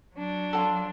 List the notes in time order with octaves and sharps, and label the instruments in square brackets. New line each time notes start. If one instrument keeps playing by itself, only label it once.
[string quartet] F#3 D4
[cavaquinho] F4 F#4 A4